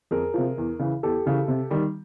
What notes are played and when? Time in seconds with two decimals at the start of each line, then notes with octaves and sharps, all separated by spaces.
0.11 F2 G#4 A#4
0.34 C3 F3
0.58 E2
0.79 C#3 E3
1.03 E2 G4 A4
1.26 C#3 E3
1.48 C3
1.71 D#3 G3